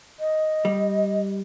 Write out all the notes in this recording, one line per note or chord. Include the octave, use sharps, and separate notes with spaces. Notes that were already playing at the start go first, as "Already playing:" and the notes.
D#5
G3